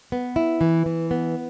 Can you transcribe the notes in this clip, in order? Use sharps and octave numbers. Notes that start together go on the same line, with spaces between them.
B3
E4
E3
E3
B3